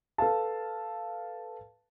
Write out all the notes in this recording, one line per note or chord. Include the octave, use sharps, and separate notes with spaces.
A4 B4 F5 A5